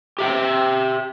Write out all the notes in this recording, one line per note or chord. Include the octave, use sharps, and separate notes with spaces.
G4 E5 G5